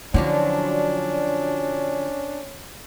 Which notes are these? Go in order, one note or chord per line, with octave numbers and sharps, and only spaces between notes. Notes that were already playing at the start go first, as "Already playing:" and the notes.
D3 F3 F#3 C#4 D4 E4